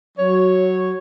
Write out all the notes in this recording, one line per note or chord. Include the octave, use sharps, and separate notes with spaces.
F#3 C#5